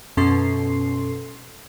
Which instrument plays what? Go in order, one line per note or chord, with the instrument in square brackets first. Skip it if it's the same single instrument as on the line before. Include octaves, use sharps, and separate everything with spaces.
[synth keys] F#2 B2 C#4 A4 C6 C7